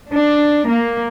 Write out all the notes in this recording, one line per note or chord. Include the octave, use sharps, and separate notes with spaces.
D4
A#3